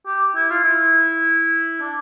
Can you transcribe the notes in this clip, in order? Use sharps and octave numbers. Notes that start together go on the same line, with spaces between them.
G4
E4
F4
E4
D4